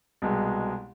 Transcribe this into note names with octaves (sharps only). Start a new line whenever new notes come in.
C2 B2 G#3